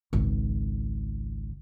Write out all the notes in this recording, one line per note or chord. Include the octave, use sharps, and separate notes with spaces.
G#1 C#2